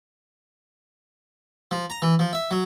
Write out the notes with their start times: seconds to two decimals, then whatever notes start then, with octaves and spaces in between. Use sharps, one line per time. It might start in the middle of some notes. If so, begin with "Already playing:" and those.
1.71 F3
1.90 A#5
2.02 E3
2.19 F3
2.33 E5
2.51 F#3